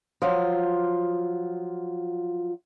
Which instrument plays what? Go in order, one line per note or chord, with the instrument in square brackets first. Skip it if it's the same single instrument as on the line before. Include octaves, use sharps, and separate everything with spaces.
[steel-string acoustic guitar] F3 F#3 F4